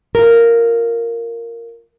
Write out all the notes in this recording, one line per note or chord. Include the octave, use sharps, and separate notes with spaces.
F4 A#4